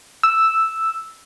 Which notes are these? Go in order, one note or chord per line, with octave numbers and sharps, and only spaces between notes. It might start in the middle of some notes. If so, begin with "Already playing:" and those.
E6